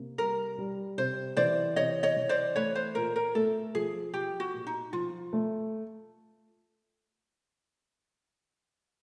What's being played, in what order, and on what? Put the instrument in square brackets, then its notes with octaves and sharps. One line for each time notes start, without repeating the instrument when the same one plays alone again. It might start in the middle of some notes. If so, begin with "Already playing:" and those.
Already playing: [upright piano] C3 A#3
[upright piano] G3 [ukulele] A#4
[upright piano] G3
[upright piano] C3 [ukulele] C5
[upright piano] E3 [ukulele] C5 D5
[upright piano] C3 [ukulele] C#5 D#5
[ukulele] C#5 D#5
[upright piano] E3
[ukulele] C5 D5
[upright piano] A3 [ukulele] B4 C#5
[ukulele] C5
[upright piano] A#2 [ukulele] A#4
[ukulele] A#4
[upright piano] A3 [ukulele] A4
[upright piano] F3 [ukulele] G#4
[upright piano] F3 [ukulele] G4
[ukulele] F#4
[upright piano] A#2
[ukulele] D#4
[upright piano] F3 [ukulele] F4
[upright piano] A3